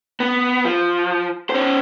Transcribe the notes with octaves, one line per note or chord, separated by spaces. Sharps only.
B3
F3
C#4 C5